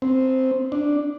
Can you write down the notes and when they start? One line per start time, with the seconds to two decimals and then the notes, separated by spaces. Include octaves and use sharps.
0.02 C4
0.72 D4